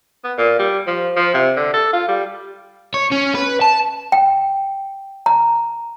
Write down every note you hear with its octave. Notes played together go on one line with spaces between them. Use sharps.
B3
A#2
G3
F3
F3
C3
D3
A4
F4
G3
C#5
C#4
B4
A5
G5
A#5